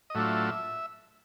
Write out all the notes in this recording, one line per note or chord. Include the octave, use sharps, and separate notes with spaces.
D#5
A2 F#3 A3 D4 F4 E5